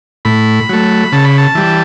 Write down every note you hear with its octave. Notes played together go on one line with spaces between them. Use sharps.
A2 B5
F#3 A3
C#3 A5
B5
A5
E3 G3